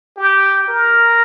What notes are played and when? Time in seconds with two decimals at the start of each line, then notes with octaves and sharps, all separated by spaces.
0.17 G4
0.68 A#4